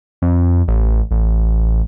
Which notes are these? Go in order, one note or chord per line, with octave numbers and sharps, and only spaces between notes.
F2
A1
A1